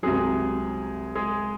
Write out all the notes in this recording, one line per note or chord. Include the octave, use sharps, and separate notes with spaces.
C2 C3 F#3 G#3 G#4
G#3 G#4